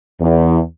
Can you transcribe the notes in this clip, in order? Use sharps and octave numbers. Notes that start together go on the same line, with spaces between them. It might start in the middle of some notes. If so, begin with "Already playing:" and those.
E2